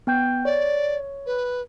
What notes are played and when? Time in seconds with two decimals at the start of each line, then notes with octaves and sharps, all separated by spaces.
0.07 B3 G5 G6
0.45 C#5 D5
1.26 B4